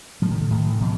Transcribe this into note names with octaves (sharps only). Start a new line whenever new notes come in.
A2 F3
D#3
D3
A2 D#3
E3
B2 F3